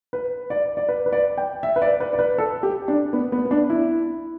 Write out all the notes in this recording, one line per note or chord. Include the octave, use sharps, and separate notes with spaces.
B4
D5
D5
B4
B4
D5
G5
E5
B4
D5
B4
D5
B4
A4
G4
D4
B3
B3
B3
D4
E4